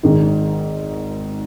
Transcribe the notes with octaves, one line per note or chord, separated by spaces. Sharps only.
G#1 G#2 D#3